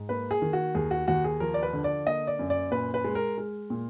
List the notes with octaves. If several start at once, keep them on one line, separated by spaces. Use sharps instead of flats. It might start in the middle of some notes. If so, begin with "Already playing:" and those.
Already playing: G#2
A#3 B4
G#4
D#3
F#4
D#2 G#4
F#4
D#2 F#4
G#4
F3 A#4
D5
B4
D3
D5
A#3 D#5
D5
F#2
D5
A#2 B4
B4
G#3
A#4
G#3
A#2